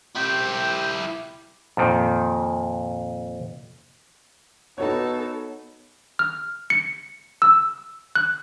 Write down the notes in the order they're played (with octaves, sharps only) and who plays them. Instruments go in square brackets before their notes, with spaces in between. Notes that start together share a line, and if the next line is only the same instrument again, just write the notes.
[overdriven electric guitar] E4 G4 [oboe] G5
[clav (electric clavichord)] F2 A#2 D#3
[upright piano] B3 F#4 C#5 [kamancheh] D#4 A4
[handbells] F6
C#7
E6
F#6